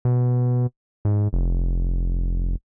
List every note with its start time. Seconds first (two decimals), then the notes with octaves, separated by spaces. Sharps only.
0.05 B2
1.05 G#2
1.33 F1